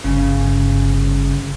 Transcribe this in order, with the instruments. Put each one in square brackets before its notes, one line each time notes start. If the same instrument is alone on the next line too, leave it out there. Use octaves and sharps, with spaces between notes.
[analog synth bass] G1 [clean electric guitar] C#3